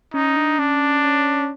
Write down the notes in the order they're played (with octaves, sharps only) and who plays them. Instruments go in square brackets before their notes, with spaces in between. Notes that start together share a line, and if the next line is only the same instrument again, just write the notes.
[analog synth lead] C#4 [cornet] D#4
[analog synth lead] D4
[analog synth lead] C#4 [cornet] D4
[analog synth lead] C#4